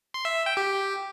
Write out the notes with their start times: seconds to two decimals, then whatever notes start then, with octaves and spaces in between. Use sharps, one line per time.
0.14 C6
0.25 E5
0.36 E5
0.46 G5
0.57 G4